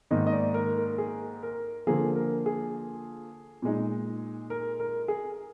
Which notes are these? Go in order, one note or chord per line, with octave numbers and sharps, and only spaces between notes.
G#2 D#3 A#3 D#4 D#5
D#5
D5
A#4
A#4
G#4
A#4
D3 F3 A#3 G#4
A#4
G#4
A#2 G#3 D#4
A#4
A#4
G#4